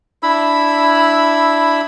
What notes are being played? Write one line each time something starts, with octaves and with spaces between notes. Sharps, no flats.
D4 E4 B5 E6